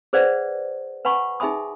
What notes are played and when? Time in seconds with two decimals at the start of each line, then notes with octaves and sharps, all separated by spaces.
0.13 G#4 B4 C5 D5 F#5
1.05 B4 F#5 G#5 B5 C#6
1.40 D#4 G#4 E5 G#5 B5 D#6